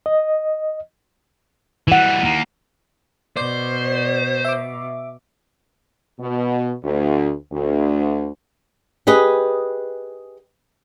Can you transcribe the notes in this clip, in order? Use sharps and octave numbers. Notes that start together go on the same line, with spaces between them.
D#5
E3 G3 E4 F#5
D#2 A#3
B2 C5 D5
E5 D6
B2
D2
D2
G4 G#4 B4 D#5